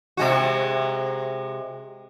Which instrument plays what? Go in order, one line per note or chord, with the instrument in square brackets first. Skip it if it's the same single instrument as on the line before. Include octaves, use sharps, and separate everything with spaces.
[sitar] C3 G#3 F#4